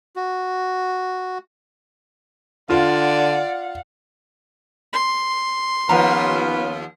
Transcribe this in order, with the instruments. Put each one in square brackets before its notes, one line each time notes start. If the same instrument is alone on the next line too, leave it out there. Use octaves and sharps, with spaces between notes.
[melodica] F#4
[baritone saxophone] D3 [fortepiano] F4 [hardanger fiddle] D5 [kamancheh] F5 F#5
[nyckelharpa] C6
[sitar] D#2 F3 [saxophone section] B3 C#4 F4 [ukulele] B4 F#5 A#5